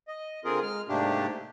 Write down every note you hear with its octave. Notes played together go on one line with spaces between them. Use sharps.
D#5
D3 C4 F4 G#4 A#4
G#3 F6
G#2 C3 A3 A#3 D4 G4